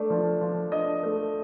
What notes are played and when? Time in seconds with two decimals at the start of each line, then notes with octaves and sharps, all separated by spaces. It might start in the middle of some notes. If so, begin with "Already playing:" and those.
Already playing: A3 D4
0.10 F3
0.41 F3
0.72 D4 D#5
1.03 A3